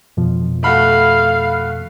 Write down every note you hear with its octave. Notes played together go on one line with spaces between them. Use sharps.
F2 B2 F3
A3 F#4 F5 B5